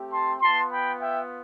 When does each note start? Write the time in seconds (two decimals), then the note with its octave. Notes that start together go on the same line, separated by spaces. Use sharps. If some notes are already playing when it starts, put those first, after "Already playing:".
Already playing: A3 C4 G4
0.12 A5 C6
0.41 B3 F4 A5 C6
0.71 G5 B5
1.00 E5 G5